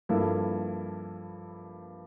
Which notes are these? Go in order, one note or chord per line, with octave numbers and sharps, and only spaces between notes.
G2 F3 A#3 E4 A4